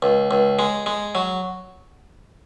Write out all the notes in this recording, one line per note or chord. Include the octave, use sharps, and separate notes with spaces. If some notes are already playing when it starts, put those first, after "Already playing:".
C#2
C#2
G#3
G#3
F#3